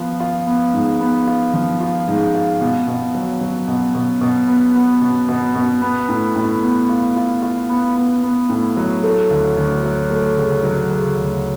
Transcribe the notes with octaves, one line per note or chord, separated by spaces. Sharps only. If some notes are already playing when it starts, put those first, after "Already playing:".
Already playing: F3 B3 F4
F4
B3
G#2
B3
F4
F3
F4
G#2
F4
B2
B2
F#3
F#3
B2
B2
B2
B3
B3
B2
B2
B2
B3
A2
A2
B3
F4
F4
F4
B3
B3
B3
A2
F#3
A3
D2
D2
F#3
A3
C#3
F#3
C#3
D2